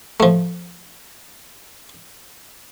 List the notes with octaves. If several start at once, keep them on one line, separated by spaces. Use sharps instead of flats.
F3 A3